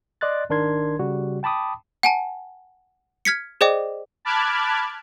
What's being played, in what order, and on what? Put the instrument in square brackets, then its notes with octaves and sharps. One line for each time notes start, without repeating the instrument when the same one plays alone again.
[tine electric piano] D5 D#5 C6 F#6 A6
G#1 D#3 D4 A#4 C6 G#6
C#3 G3 F#4
G5 A5 B5 D6 D#6
[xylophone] F#5 G#5 A5
F6 G#6 B6 C#7
G#4 C5 D5 D#5 G5 D6
[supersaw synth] A5 B5 D6 F6 F#6 G#6